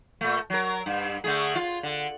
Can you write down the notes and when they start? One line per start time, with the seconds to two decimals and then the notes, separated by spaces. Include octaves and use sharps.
0.21 A#2 A3
0.50 F#3 A#4
0.86 G2
1.24 D3 A3 G#4
1.55 F4
1.83 D3